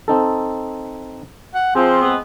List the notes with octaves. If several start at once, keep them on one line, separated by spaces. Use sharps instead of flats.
C4 D#4 A4
F#5
F3 C4 G#4
G#3 B3